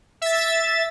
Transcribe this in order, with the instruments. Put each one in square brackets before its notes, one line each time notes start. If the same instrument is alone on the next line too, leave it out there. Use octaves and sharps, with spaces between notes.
[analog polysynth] E5 A6